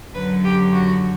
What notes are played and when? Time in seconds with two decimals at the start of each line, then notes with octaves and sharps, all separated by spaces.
0.13 F#2 D3 F#3 B4
0.43 G4
0.72 F#4